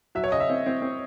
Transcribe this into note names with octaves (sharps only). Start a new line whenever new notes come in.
F#3 E5
C#5
C#3 D#5
E5
C4
C4
C4